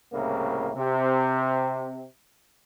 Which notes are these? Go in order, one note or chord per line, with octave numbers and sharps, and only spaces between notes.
C2 A2 C#3 A#3
C3